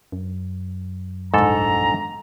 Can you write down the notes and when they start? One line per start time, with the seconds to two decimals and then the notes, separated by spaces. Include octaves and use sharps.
0.12 F#2
1.34 D#1 A#1 G#2 A4 A#5